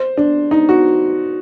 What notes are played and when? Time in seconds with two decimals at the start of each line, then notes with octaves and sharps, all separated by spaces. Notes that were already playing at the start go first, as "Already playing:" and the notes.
Already playing: C5
0.17 D4
0.51 D#4
0.69 F#4